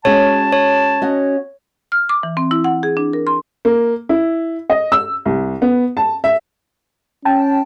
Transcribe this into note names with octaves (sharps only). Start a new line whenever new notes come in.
G#3 C#4 F#4 C#5 A5
C#5
C#4 F#4 D#5
F6
D6
E3
C4
E4
F#5
G#4
D4
A#4
C6
A#3
E4
D#5
E6
C2
B3
A5
E5
C#4 G5 A5